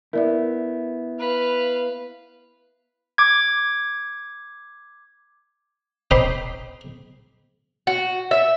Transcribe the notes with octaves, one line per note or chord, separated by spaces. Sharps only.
B3 E4 A#4 D5 E5
B4 F5
D6 G#6
D#4 C5 G5 B5 C6 D6
F#4
E5